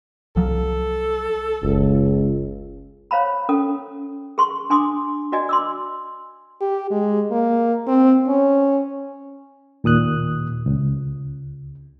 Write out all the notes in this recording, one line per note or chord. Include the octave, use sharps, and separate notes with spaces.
C2 F3 F#3 A4
F#1 C#2
C5 C#5 F5 A#5 B5
C#4 A4 D#6
G#4 C6 C#6
D4 G#5 C6 D6 D#6
F#4 D5 D#5 G#5
C6 D6 E6
G4
G#3
A#3
C4
C#4
D#2 A#2 D#6 F#6
C#2